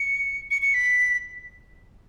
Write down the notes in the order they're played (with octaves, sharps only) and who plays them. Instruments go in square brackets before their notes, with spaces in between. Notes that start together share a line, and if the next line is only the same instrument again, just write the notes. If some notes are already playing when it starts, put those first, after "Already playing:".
Already playing: [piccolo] C#7
C#7
C#7
B6